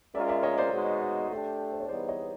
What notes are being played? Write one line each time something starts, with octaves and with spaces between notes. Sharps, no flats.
G#3 C#4 F4 A#4 D5 E5
D5 E5
C#5 D#5
C5 D5
G#3 B3 D#4 F#4
A3 D4 G4
C5
C#5
E3 G3 B3 D#4 G#4 C5 D5
C#5 D#5